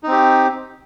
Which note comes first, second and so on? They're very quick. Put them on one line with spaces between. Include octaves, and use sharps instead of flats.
D#4 C4 G4